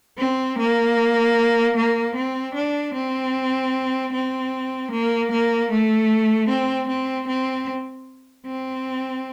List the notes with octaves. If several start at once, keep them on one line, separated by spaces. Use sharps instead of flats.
C4
A#3
A#3
C4
D4
C4
C4
A#3
A#3
A3
C4
C4
C4
C4